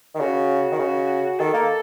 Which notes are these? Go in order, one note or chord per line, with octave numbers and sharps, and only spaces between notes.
D#3
C#3 F#4
D#3
C#3
D#3 A4
A#3